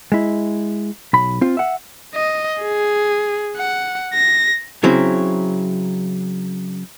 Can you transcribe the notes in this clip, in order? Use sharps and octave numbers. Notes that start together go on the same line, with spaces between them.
G#3 E4
B1 B5
C4 F4
E5 F#5
D#5
G#4
F#5
A#6
C#3 F#3 C4 E4